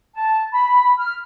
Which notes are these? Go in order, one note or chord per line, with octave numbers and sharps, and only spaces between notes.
A5
B5
F6